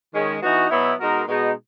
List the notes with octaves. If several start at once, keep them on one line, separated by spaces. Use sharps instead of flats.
D#3 G#3 C#4
E3 B3 D#4 F#4
B2 F#3 B3 E4
B2 G#3 D#4 F#4 A#4
B2 G#3 D#4